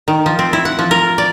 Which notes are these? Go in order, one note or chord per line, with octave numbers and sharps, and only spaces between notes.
D#3
F3
C4
E4
F#5
F3
A#4
D5